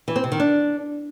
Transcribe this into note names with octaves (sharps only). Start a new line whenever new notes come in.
E3
C4
C3
D#3
D4